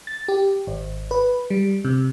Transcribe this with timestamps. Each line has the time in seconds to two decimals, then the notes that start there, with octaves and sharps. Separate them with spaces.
0.07 A6
0.28 G4
0.67 G#1
1.11 B4
1.50 G3
1.85 C3